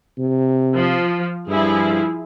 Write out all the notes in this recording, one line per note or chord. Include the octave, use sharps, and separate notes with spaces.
C3
F3
G2 F3 E4 G#4